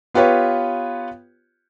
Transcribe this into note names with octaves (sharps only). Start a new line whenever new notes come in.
B3 F4 G4 B4 C#5